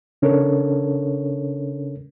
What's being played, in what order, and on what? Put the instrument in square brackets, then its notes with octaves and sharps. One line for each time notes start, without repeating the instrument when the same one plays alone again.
[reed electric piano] C#3 C#4 D4 A4 A#4 C#5